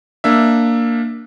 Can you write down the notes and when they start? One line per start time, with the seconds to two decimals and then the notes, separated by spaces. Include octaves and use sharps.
0.24 A#3 D4 E5